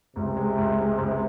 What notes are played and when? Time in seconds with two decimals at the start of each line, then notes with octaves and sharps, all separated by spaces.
0.16 C#2 C3
0.37 G#3
0.58 C#2
0.78 G#3
0.98 C#2